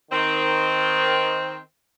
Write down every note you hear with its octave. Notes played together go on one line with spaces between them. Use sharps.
D#3 C4